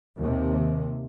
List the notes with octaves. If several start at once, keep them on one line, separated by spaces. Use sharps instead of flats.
D#2 C3